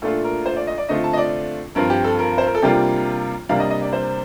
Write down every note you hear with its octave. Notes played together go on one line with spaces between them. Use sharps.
A#2 A3 D4 F4 A4
A#4
C5
D5
D#5
D5
D3 A3 C4 F4 D#5
A5
D#5
D5
G2 F3 C4 F4 A#4
G4
A4
A#4
C5
A#4
A4
C3 G3 A#3 D4 F4 G4
C3 G3 A#3 D4 F5
D#5
D#5
D5
C5